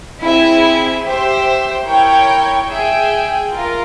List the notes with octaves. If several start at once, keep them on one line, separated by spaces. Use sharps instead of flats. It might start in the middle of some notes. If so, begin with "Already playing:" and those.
C4 E4 G#4 E5
G4 C5 E5
E4 A#4 C#5 G5
G#4 E5 G5
F4 A#4